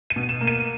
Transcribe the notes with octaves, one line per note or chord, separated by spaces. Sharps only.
D#7
B2
E7
A#3
D#7